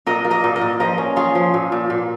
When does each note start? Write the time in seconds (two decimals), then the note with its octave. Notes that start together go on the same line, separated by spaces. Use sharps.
0.06 A#2 A#4 D#5
0.25 A#3
0.31 A#4 D#5
0.44 A#2
0.56 A#4 D#5
0.61 A#2
0.80 F3 A#4 D#5
0.98 C#4
1.16 F4 G#4 C#5
1.35 F3
1.54 A#2
1.72 A#2
1.90 A#2